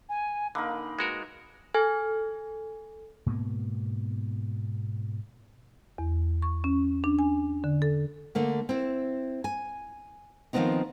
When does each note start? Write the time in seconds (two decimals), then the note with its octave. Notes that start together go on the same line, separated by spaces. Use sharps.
0.09 G#5
0.55 D3 A#3 D#4 A#4 B5
0.99 G#3 F#4 A#4 B4
1.74 A4 G#5 F6 G#6
3.26 G#2 B2 A#3 B3
5.98 E2
6.42 C#6
6.64 C#4
7.04 D4
7.19 G#5
7.64 D3
7.82 A4
8.35 D3 A3 A#3
8.69 C4 E4
9.44 G#5
10.53 D#3 F3 G#3 B3 C4 D#4